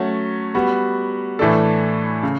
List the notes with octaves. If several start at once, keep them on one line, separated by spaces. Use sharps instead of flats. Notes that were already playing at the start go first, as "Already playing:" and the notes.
Already playing: F#3 A3 C#4
G3 B3 F#4
A2 E3 A3 D4 A4
C#3